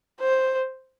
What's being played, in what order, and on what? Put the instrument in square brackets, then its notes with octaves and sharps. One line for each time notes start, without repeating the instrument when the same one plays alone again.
[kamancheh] C5